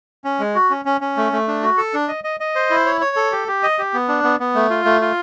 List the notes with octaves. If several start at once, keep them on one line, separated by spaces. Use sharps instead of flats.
C#4
G#3
F#4
C#4
C#4
C#4
A3
A3
D4
F#4
A4
D4
D#5
D#5
D#5
C5
E4
C#5
C#5
A4
G4
G4
D#5
G4
B3
D4
B3
B3
A3
F4
A3
F4